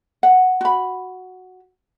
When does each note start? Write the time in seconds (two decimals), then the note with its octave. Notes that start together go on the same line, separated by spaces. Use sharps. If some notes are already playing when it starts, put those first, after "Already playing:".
0.23 F#5
0.61 F#4 B5